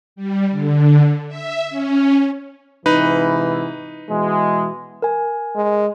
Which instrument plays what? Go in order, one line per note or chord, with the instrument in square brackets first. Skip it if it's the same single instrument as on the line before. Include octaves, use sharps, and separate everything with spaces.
[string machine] G3
D3
E5
C#4
[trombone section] G#2 C3 E3 [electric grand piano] D#4 B4
[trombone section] B2 E3 G#3
[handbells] A#4 G#5
[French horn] G#3